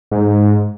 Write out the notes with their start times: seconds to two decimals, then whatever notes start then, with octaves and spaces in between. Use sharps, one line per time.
0.12 G#2